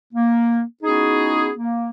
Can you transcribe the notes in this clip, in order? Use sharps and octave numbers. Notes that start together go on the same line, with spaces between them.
A#3
B3 C#4 D#4 E4 F#4 G#4
A#3